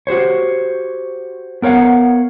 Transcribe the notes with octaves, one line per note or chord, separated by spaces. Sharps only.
F#4 G4 C5 C#5
B3 A#4 C#5 F5 F#5